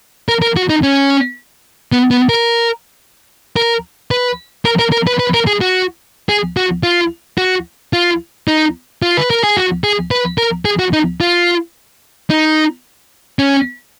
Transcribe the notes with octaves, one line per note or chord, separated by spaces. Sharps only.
A#4
A#4
F#4
D#4
C#4
B3
B3
A#4
A#4
B4
A#4
A#4
A#4
B4
B4
A#4
G#4
F#4
G#4
F#4
F4
F#4
F4
D#4
F4
B4
A#4
G#4
F#4
G#4
B4
A#4
G#4
F#4
D#4
F4
D#4
C#4